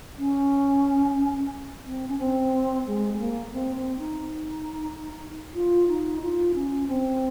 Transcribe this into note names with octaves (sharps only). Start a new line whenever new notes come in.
C#4
C4
C#4
C4
G#3
G#3
A#3
A#3
C4
C4
D#4
F4
D#4
F4
C#4
C4